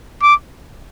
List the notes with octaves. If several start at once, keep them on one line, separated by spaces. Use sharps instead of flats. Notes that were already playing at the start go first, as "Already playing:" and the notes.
D6